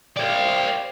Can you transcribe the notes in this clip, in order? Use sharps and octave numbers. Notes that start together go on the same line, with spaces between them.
G4 C5 D5 F5